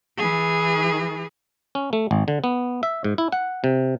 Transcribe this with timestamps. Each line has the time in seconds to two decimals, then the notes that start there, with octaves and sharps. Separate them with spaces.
0.18 E3 G#4
1.75 C#4
1.93 A3
2.11 G#1
2.28 D3
2.44 B3
2.83 E5
3.04 G#2
3.18 E4
3.32 F#5
3.64 C3